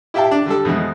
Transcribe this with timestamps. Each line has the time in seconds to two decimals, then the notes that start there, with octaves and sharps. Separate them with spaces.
0.14 E4 G4 E5 F5 G5 A5
0.31 D4
0.46 D3 G3 A4
0.65 F2 B2 E3 G#3